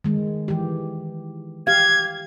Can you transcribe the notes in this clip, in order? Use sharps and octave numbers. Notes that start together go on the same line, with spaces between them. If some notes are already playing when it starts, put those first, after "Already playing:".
D#3 G#3
E3 G4
G4 F5 G#6